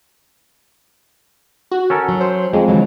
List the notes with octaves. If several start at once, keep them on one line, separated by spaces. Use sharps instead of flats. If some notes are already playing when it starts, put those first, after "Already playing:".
F#4
C#4 A4 A#4
F#3
C5
F2 G#3
D3 E3 F#3